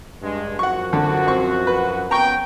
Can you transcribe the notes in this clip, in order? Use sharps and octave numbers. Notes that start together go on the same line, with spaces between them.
G2 G#3
F#2 F3 F#4 F#5 C#6
D3
C4 C#6
B4
B3 C#4 G5 A#5 C#6